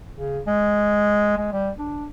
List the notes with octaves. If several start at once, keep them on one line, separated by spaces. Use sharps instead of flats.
C#3
G#3
G#3
G3
D4